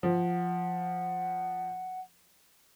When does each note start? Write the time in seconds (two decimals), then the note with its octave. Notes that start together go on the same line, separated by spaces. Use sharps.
0.03 F3 F#5